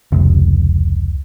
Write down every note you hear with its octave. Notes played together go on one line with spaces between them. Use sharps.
F1 C#2